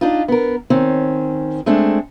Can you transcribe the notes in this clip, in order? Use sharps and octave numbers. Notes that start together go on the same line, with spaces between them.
D4 D#4 F4
B3 A#4
D#3 C4 C#4
G#3 A3 C4 D4